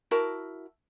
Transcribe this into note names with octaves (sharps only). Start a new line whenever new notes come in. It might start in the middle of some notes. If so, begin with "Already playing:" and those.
E4 F#4 A#4 A5